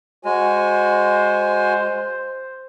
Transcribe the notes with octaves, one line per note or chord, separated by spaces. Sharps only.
G#3 F#4 C5 G#5